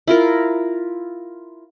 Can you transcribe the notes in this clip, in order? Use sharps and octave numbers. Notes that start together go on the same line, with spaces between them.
E4 F4 A#4